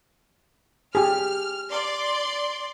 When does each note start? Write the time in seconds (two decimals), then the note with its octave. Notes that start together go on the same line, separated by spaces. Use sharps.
0.95 G4 G#4 F6
1.70 D5 C6